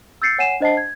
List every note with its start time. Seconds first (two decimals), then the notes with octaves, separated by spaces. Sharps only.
0.22 E6 G6 A6 C7 C#7
0.38 C#5 F#5 G#5 C7 D#7 E7
0.60 D4 C5 D#5 F#5 A5 C7
0.77 G#6